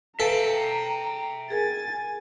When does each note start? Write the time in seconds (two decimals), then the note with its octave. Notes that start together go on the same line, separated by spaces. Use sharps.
0.20 A4 B4 E5 F5 G5 G#5 A#5
1.50 G#4 A#4 G#5 G#6 A6